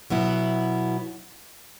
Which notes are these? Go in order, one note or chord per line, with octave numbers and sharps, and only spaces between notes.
B2 F#3 B3 E4